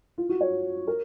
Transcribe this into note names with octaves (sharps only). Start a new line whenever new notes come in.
F4
F#4
C#5
A#4